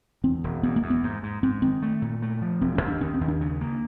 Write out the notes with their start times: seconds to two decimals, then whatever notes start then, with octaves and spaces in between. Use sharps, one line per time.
0.24 E2 C4
0.44 E1
0.63 E2 B3
0.76 A#3
0.83 E2
0.90 B3
1.03 G#2
1.23 G#2
1.43 G#2 C4
1.62 D#3 C4
1.82 A3
2.02 A#2
2.22 A3
2.42 F3
2.61 E1 C4
2.75 C#4
2.81 D#2
2.88 D4
3.01 D#3 C#4
3.14 C4
3.21 D#2
3.28 D4
3.41 C#3
3.61 A#3